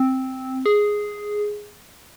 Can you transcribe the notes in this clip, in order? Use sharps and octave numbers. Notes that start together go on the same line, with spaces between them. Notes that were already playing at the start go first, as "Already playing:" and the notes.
Already playing: C4
G#4